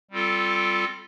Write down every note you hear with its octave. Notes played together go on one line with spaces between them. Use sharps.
G3 C4 F4 A4